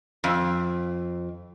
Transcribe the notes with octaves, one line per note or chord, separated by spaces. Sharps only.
F2